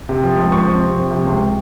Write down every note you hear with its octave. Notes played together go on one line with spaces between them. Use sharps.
C3
F3
C#2
F3 C#6
C4
C3
F3
C3
C#2